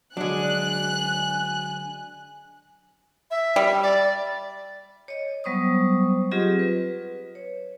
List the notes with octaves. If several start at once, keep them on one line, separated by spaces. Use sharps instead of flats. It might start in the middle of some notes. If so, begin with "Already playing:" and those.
D3 F#3 G#3 D4 G#5 F#6
E5
G3
D5
C#5 D#5
F#3 G3 B3 C5 C#6 D#6
F#3 C4 F4 G4 G#4 D#5
B4
C#5